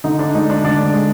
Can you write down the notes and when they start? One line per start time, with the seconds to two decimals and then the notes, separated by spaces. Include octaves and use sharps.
0.04 D3 D#4
0.19 D4
0.34 G#3 D#4
0.50 D4
0.64 D3 D4
0.94 G#3